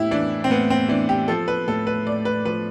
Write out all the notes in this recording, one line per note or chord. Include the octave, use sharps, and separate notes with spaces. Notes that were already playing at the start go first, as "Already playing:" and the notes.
Already playing: A2 E4 G4
E3 D4
C4
A2 B3
C4
E3 D4
G4
F3 A4
B4
A2 A4
B4
A2 D5
B4
F3 B4